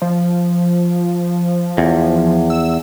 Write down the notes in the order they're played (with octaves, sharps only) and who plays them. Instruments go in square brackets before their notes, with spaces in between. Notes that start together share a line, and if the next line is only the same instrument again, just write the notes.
[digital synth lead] F3
[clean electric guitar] E2
[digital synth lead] E6